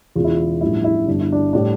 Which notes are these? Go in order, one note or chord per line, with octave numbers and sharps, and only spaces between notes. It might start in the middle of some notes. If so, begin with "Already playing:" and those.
E1 E2 C#3 F4
E4
F4
A1 G2 F3 A3 E4
E4
G1 G2 D3 D4
E4
D4
A2 G3 D4